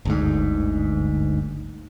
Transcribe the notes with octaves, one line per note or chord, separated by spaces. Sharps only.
G1 D2 G#2